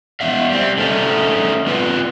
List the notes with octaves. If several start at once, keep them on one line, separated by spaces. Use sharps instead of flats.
E2 B3 E5 F5
G3 C4
D3 A3 C#4 D#4
B3 C4 F4 B4 C5